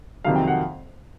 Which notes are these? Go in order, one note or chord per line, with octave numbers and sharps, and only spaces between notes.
F2 C3 D#3 F#3 F5
G5
F#5